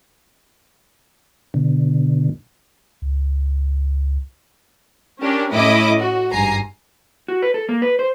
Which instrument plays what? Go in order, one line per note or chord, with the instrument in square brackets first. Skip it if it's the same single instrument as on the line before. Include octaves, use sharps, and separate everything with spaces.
[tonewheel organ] B2 D3
[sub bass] C#2
[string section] C#4 D4 G4 A#4
A2 A3 C#4 E4 D#5 D6
F#4
G#1 G2 G#5 A#5 C7
[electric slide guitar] F#4
B4
A4
A#3
B4
C5